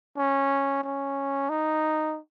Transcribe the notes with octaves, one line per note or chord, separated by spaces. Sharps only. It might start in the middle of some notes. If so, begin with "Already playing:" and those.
C#4
C#4
D#4